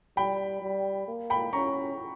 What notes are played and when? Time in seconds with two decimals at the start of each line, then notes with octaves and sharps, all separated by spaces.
0.17 G3 G5 B5
0.62 G3
1.08 A#3
1.30 G5 B5
1.53 C#4 A#5 C#6